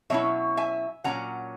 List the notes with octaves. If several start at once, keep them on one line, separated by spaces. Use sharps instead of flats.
B2 F#3 C#4 E4 C#5 E5
E5 G#5
A#2 F#3 C#4 F#5 A#5